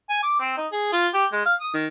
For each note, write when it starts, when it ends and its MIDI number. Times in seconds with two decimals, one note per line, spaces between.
0.10 0.22 80
0.23 0.35 86
0.40 0.56 60
0.57 0.67 63
0.72 0.91 68
0.92 1.08 65
1.14 1.25 67
1.33 1.41 56
1.46 1.55 77
1.60 1.69 87
1.74 1.87 51